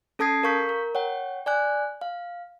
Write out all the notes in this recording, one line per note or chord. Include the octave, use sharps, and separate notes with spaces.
C#4 A4 A5 D#6 G#6 C7
A#4 F5 C#6 G6 B6
A#4
C#5 F#5 G5
D5 G#5 F#6
F5